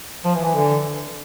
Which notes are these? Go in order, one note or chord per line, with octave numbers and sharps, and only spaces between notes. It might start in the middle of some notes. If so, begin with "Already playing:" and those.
F3
E3
E3
D3